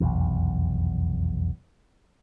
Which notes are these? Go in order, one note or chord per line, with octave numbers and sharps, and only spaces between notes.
F1 B1 E2